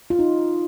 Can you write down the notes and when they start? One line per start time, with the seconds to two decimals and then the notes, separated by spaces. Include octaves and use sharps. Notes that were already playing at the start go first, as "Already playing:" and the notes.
0.10 F4
0.19 D#4